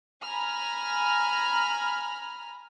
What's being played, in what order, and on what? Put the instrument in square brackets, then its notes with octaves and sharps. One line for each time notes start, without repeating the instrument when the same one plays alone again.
[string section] G#5 A#5 B5 F6